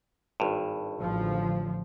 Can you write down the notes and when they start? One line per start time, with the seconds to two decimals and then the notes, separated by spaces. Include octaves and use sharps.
0.40 G#1 G2
1.00 A1 D3 F3